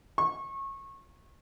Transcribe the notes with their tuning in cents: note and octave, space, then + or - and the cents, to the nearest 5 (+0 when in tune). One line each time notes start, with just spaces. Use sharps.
C#6 -25